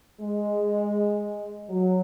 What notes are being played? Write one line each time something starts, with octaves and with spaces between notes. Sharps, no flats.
G#3
F#3